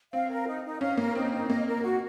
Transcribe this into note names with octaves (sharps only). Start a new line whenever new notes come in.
C4 F5
A#4
D#4
D#4
C#4 F5
A#3 A#4
C4 D#4
C4 D#4
A#3 D#5
A#4
F#4